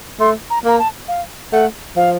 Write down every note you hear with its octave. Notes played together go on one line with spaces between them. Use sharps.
A3 C6
A#5
A#3 A#5
A5
F5
A3 F#5
F3 F5